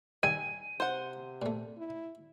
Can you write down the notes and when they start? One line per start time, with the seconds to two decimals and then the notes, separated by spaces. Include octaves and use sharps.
0.23 D#3 G3 E5 G#5 D#7
0.80 C3 C5 F#5
1.42 A#2 A3
1.77 E4